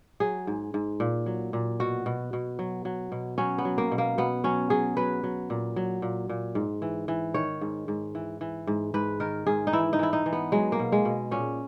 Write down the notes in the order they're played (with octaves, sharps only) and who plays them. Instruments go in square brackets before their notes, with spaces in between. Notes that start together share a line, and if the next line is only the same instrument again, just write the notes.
[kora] F#3 G#4
G#2
G#2
A#2
F#3
A#2
B2 F#4
B2
B2
F#3
F#3
B2
F#3 C#4
B3
F#3
A#3
B2
A#3
B2 B3
F#3 C#4
F#3 G#4
F#3 B4
F#3
A#2
F#3
A#2
A#2
G#2
E3
E3
D#3 C#5
G#2
G#2
E3
E3
G#2
G#2 B4
D#3 A#4
G#2 G#4
D#4
E3 E4
D#4
E3 E4
D#4
E3
B3
F#3 G#3
A#3
B2
G#3
B2
A#2 C#4